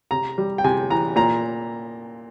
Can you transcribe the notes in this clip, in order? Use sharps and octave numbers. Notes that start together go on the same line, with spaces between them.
C3 A#5
G3
G5
C3 G#5
E3 A#5
A#2 A#5